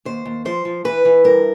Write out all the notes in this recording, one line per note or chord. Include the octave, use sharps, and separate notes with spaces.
D#2 C5
D#2
F3 C5
F3
E3 B4
E3
G2 A#4